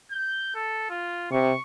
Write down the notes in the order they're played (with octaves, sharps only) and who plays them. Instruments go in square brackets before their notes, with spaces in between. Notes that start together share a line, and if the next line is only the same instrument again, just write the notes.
[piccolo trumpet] G6
A4
F4
[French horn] C3 [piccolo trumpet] C#6